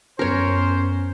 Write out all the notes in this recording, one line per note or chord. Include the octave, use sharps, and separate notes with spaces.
F#2 B3 C#4 A#4 C5 C#5 F6